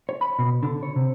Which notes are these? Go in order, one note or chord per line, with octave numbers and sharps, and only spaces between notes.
C#5
B5
B2
D3
C#5
C3